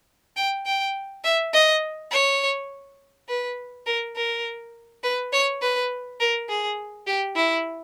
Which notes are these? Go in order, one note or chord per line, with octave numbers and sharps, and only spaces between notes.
G5
G5
E5
D#5
C#5
B4
A#4
A#4
B4
C#5
B4
A#4
G#4
G4
E4